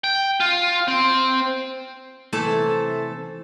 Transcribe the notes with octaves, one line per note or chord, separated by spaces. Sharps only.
G5
F4
C4
C3 E3 A3 A4 C5 A5